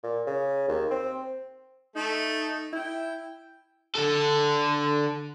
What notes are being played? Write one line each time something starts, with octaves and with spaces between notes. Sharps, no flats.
A#2
C#3
D#2
C4
A3 D#4
E4 G5
D3 A4